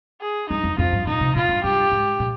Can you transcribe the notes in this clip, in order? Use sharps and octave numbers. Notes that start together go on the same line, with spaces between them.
G#4
G2 D#4
F2
F2 F4
G2
A#2 D#4
C3
A#2 F4
G2
G2 G4
G#2
A#2